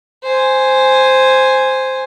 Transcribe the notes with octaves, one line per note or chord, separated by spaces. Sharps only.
C5 G#5